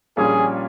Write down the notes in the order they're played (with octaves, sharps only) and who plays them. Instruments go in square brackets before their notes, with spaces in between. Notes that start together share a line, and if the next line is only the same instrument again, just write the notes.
[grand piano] A#1 A#2 G3 C#4 [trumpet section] G#4